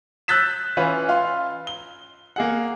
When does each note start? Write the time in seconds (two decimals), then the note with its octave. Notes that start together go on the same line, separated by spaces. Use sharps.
0.28 E6 F#6 G6 A6 B6 E7
0.77 E3 C#4 F4 B4
1.08 F4 F5 C6
1.67 G7
2.36 A#3 G#4 F#5